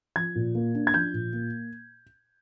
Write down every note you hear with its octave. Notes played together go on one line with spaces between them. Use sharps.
F3 G#6
A#2
A#3
D4
G#6
F3 G6
A#2
A#3